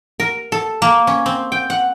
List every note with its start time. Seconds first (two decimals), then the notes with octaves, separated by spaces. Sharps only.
0.20 A#4
0.52 A4
0.82 A#3
1.07 C#4
1.26 C4
1.52 G5
1.70 F#5